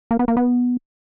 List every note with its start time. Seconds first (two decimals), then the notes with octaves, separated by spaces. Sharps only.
0.11 A#3
0.19 B3
0.28 A#3
0.37 B3